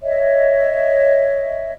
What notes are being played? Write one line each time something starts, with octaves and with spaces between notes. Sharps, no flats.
C#5 D#5 E5